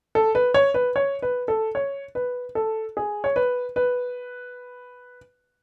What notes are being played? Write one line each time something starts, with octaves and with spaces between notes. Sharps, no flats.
A4
B4
C#5
B4
C#5
B4
A4
C#5
B4
A4
G#4
C#5
B4
B4